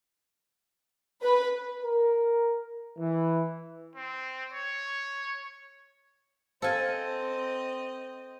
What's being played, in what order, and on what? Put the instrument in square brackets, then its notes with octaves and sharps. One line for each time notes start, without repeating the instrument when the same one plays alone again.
[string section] B4
[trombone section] A#4
E3
[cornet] C4
C#5
[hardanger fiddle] C4 D#5 [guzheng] A4 G#5 [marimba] C5 F5 F6